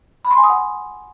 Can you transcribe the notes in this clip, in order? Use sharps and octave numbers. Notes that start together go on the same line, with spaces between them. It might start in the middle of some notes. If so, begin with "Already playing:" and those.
B5
C6
G#5
D#6
F#5